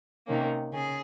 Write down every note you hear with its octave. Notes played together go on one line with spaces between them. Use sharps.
C3 D#3 A#3 C#4
C#3 G#4